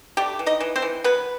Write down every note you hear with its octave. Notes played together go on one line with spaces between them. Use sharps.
G3 A3 G4
E3
D#4 D#5
E3
C4 C5
E3
F#3 B3 B4